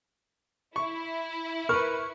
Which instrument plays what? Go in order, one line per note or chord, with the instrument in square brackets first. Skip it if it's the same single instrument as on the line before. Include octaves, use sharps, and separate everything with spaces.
[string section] E4 [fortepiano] C#6
[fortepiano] A#4 B4 [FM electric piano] C#6 [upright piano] F6